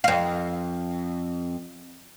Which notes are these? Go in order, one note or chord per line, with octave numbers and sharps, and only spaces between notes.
F2 F5